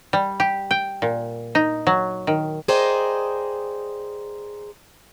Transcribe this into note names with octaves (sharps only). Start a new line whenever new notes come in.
G3
G4
G5
A#2
D#4
F#3
D#3
G#4 A#4 C5 D5 D#5 G5